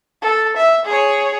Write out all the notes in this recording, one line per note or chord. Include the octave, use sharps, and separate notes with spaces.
A4
E5
G#4 C#5